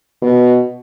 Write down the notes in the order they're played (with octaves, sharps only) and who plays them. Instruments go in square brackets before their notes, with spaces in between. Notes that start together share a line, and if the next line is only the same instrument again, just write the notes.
[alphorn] B2